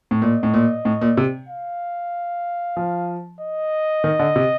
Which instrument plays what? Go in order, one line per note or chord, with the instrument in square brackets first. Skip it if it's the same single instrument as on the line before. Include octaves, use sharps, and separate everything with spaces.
[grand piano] A2
[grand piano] A#2 [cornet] D#5
[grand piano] A2
A#2
A2
A#2
C3
[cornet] F5
[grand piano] F3
[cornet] D#5
[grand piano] D#3
D3
C3